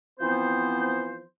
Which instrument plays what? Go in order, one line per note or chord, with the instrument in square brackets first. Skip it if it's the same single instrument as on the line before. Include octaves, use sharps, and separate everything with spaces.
[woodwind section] E3 F3 B3 C4 C5